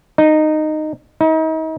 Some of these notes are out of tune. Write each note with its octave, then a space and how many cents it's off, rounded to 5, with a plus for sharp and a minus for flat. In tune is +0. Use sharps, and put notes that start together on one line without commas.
D#4 -15
D#4 +35